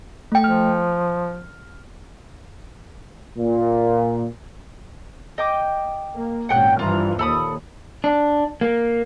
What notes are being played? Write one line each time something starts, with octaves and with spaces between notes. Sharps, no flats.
A3 G5
F3 F6
A#2
D#5 G5 D6
A#3
G#1 A#2 C#4 F#5 G5 F#6
G2 E3 F3 F4 A#5
D#2 A#2 A4 B5 D#6
D4
A#3